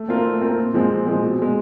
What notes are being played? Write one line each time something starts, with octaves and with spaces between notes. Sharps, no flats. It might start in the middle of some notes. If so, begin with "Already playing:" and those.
Already playing: A3
C4 F4 A#4
A3
C4 F4 A#4
A#2
F3 G#3 C4
A#2
F3 G#3 C4
B2
G#3 C4